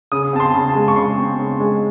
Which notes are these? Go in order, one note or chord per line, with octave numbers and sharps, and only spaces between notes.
C#3 D#6
C4 A5
C6
C#3
A5
G#3
C#6
C#3 C6
C4
C#3
G#3